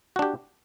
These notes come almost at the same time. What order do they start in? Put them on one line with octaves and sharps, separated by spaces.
F#4 D4 G4